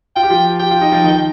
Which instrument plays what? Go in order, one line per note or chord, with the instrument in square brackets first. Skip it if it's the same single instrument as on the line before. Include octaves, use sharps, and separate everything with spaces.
[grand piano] F4 [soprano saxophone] G5
[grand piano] G4
F3 F4
[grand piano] G4 [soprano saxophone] G5
[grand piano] F4
D#4
F3 F4
D#3 D#4